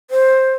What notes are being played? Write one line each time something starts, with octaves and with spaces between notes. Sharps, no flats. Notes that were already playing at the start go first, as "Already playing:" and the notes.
C5